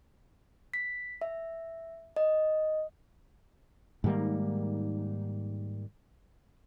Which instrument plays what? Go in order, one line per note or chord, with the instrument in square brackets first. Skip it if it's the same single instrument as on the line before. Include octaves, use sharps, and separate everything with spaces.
[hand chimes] B6
E5
D#5
[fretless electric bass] G#2 D#3 G3 A#3